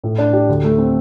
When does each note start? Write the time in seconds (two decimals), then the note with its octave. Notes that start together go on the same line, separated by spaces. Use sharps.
0.04 A2
0.18 D4
0.33 G4
0.49 D2
0.64 A3
0.78 C4